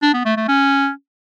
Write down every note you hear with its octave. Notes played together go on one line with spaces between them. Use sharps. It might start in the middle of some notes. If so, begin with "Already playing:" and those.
D4
B3
A3
A3
C#4